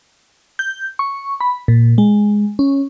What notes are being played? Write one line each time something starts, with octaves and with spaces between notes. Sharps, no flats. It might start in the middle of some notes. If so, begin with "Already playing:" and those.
G6
C#6
B5
A#2
G#3
C#4